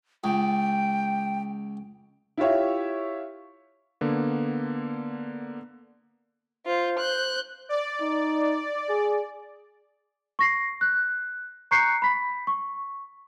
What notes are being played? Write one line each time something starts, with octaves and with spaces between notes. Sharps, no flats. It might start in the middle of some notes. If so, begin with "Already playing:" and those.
C#2 G5
E4 F4 G4 C#5 E5
D3 A#3 B3
F4 C5
F#6 G6
D5
D#4
G#4
C#6 A#6 C7
F#6
A#5 C#6 F#6 G6 C7 C#7
B5 B6
C#6